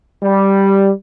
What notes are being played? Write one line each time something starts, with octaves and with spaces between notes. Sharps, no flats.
G3